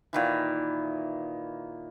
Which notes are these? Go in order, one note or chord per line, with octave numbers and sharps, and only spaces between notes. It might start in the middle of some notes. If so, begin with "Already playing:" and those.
A#2 D#3 E3